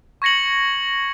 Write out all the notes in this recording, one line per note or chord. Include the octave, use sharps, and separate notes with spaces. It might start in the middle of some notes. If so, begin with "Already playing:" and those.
C#6 G#6 A#6 C#7 F#7